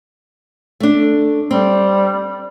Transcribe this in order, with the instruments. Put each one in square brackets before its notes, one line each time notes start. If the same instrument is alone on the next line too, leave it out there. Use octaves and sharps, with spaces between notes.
[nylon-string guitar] A3 D4
[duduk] G3 [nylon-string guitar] C4